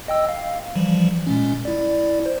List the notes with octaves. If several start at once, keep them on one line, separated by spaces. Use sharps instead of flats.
D#5 G5 E6
F5
E3 F3 G3
A#2 G#3 C#4
E4 D5
C5